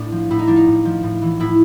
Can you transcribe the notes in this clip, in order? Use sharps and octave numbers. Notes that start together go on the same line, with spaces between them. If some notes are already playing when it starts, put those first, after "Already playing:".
Already playing: A2 D4
F3
A2 E4
D#4
F3 D4
D#4
A2
F3
A2
E3
A2 E4